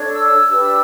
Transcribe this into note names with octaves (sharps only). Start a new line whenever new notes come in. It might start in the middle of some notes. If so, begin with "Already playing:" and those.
Already playing: D4 A4 C#5
E6
D4 G4 B4 E6